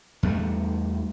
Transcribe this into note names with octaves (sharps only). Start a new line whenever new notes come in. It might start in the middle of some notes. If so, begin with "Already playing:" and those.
E2 G3 A3